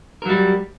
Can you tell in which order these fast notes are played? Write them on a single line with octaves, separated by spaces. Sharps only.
A#4 F#3 G3